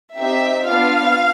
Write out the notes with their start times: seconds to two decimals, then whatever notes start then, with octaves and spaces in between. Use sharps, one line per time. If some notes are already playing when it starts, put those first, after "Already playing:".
0.17 C4 D#4 G4 E5
0.65 B3 D4 F4 F5